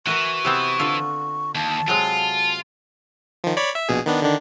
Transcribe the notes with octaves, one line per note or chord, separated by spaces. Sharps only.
E3 F#4 A#4 F#5 C#6
C3 B3 C4
D3 F4 A4
D#2 A5
C3 F#3 G#3 F4
D#3 F3
C#5 D5 B5
E5
A#1 B2 G#4
D#3 B3 D4
D3 D#3 D4